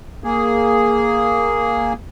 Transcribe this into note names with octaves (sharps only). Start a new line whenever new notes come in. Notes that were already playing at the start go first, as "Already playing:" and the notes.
A#3 G#4